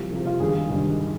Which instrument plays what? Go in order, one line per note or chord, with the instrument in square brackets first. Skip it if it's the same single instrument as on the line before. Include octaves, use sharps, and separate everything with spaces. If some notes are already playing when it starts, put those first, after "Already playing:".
Already playing: [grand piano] C2 C3 F3
C2 C3 F3
F4
G#1 G2 D#3 G#4
G#1 G2 D#3